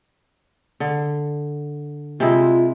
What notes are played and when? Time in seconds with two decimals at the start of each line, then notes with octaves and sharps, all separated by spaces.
0.80 D3
2.20 C3 G#3 E4 F4